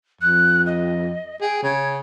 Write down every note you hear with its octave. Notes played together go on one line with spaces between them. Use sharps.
F2 F#6
D#5
G#4 G5
C#3 G#6